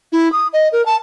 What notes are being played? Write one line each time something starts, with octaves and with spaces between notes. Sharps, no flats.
E4
D#6
D#5
A#4
A5